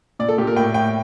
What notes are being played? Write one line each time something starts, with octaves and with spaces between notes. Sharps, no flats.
A#2 D5
A4
A#2 G4
A#4
A2 G5
A2 G5